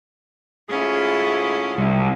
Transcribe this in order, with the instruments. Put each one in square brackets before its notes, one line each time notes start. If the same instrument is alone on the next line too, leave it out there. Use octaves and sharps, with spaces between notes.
[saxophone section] D2 G#2 G#4 [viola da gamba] C#4 E4 F4
[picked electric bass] C2 [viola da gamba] C3